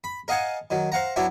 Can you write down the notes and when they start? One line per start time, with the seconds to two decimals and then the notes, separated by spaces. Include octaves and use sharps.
0.04 B5
0.28 A#4 D#5 F5 F#5 G#5 A5
0.70 D#3 F#3
0.92 C5 F5 F#5 A#5
1.16 F#3 B3 D4 E4 E5